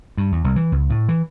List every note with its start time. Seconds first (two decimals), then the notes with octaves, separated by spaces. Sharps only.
0.17 G2
0.32 E2
0.44 C2
0.56 E3
0.72 C#2
0.90 A2
1.09 E3